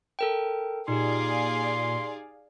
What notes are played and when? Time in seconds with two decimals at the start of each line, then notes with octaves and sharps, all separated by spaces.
0.19 A4 A#4 G5
0.88 A#2 D#4 G4 G#4 D5 F5 C6